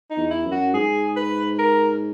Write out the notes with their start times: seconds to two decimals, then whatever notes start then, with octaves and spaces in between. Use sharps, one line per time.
0.10 D#4
0.17 E2
0.31 E4
0.45 F#2
0.52 F#4
0.73 G#2 G#4
1.16 B4
1.59 A#4